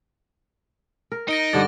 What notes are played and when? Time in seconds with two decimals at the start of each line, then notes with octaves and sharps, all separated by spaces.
1.12 A#4
1.28 D#4 A#6 D7 G7
1.53 G2 D3 D4 A6